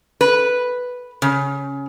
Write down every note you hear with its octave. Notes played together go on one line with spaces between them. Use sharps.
B4
C#3